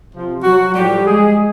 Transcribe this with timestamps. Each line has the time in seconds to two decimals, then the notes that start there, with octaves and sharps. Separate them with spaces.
0.12 C3 F3
0.43 F#3 F#4
0.74 A2 F3 G3 G4
1.06 G#3 G#4